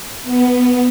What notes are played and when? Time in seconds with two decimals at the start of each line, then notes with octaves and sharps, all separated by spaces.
0.24 B3